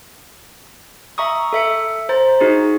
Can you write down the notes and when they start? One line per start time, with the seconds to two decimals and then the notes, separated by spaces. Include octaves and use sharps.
1.18 E5 A#5 C#6 D#6
1.53 A4 E5 C#7
2.09 C5 A#5 A6
2.40 D#4 F#4 G#4 A6